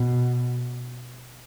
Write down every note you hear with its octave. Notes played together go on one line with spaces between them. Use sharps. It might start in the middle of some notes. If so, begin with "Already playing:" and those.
Already playing: B2